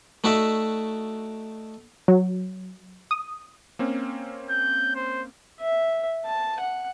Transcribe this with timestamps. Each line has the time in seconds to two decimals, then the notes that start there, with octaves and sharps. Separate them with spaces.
0.24 A3 D#4 F#4 D5 E5
2.08 F#3
3.11 D#6
3.79 A#3 C4 C#4
4.50 G6
4.95 C5
5.61 E5
6.25 A5
6.60 F#5